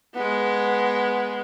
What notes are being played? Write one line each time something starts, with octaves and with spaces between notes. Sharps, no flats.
G#3 B3